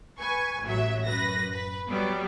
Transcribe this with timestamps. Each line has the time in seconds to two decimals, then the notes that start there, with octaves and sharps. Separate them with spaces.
0.20 B4 G#5 C#6
0.63 A1 F#3 E5
1.06 F#2 B4 A#6
1.51 B4
1.89 F#3 G3 B3